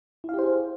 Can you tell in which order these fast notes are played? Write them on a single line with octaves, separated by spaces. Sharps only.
E4 F5 G4 C5 G#4